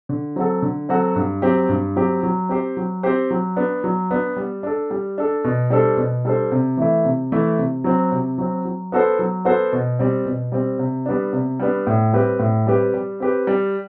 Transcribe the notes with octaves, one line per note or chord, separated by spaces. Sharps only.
D3
F#3 C4 F#4 A4
D3
F#3 C4 F#4 A4
G2
F#3 C4 G4
G2
F#3 C4 G4
F#3
C4 G4 C5
F#3
C4 G4 C5
F#3
B3 D4
F#3
B3 D4
G3
D4 A4
G3
D4 A4
B2
G3 D4 A4 C5
B2
G3 D4 A4 C5
C3
E3 A3 E4
C3
E3 A3 E4
C3
F#3 C4
C3
F#3 C4
F#3
B3 F#4 A4 C5
F#3
B3 F#4 A4 C5
B2
G3 C4
B2
G3 C4
C3
G3 B3 D4
C3
G3 B3 D4
A2
G3 C4 G4 B4
A2
G3 C4 G4 B4
G3
C4 G4 B4
G3